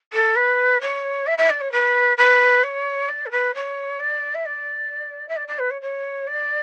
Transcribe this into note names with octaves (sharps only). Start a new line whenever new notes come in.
A4
B4
C#5
E5
E5
D5
C#5
B4
B4
C#5
D5
A4
B4
C#5
D5
E5
D5
E5
D5
D5
B4
C#5
C#5
D5